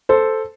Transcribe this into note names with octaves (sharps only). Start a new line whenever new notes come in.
A4 C5